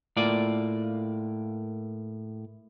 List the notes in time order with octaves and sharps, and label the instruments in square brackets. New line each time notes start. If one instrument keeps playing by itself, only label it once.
[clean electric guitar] A2 A#3 F4 D5